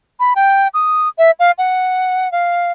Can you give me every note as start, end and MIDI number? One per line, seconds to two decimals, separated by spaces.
0.20 0.34 83
0.36 0.68 79
0.74 1.08 87
1.18 1.31 76
1.39 1.51 77
1.58 2.31 78
2.32 2.72 77